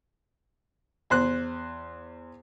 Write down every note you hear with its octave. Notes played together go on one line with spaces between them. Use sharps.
E2 C5 F#6